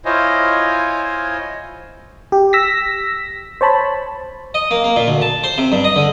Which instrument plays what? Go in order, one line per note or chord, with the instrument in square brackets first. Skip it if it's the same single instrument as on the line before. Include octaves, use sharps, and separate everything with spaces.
[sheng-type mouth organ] E4 F4 C5 C#5 D#5 G#5
[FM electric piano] G4
E6 A#6 B6
C5 C#5 A5 B5
[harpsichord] D#5
A#3
A#3
A#2
D2
A5
C5
C3
G2
D#5
D3